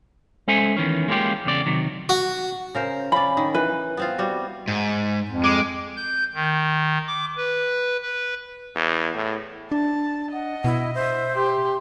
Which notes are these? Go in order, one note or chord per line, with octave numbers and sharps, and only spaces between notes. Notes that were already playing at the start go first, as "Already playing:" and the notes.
G#3 C#4 A4 C5 E5 G#5
E2 D#3 E3 C#4
G#3 A#3 C#4 F4 G4
E2 C#3 D5
C3 D#3 F#3
F#4
C#3 A#4 C5
C#3 C#4 D5 B5
D#3
E3 B4
B3 C4 F4
G3 F#4
G#2
F2
G#3 D6
G6
D#3
D6
B4
B4
E2
A2
D4 A5
D#5 F#5
B2 E4
C5 E5
G4 C6